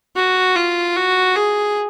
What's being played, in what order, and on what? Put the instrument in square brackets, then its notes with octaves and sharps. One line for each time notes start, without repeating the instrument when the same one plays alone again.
[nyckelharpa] F#4
F4
F#4
G#4